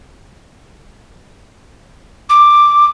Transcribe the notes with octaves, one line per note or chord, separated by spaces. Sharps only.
D6